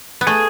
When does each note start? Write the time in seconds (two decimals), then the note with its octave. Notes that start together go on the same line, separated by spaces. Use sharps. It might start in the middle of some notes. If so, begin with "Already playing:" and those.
0.21 B3
0.27 A3 G#4